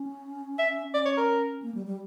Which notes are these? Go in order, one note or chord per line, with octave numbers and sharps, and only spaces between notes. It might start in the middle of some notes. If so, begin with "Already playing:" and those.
Already playing: C#4
E5
C#4 D5
C#5
A#4
A#3
G3
G3